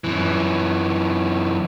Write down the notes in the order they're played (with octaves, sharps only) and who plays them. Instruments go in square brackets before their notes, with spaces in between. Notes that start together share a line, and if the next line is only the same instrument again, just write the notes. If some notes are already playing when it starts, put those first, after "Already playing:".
[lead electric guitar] F#2 E3